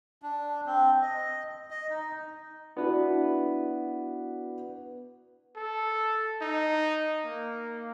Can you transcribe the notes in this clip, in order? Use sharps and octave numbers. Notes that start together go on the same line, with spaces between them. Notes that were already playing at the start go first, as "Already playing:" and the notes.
D4
C4
D#5
D#5
D#4
B3 D4 E4 F#4 B4
A4
D#4
A#3